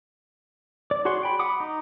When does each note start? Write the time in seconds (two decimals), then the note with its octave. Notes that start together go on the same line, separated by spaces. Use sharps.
0.91 D5
1.05 F#4 G#4 C#5 F#5 C6
1.23 G5 B5
1.39 F#5 B5 D6 D#6
1.60 D#4